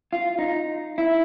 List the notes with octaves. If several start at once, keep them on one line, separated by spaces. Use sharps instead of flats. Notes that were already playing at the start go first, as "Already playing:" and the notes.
F4
D#4
E4